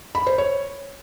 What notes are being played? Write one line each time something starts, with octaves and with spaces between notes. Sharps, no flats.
B5
C5
C#5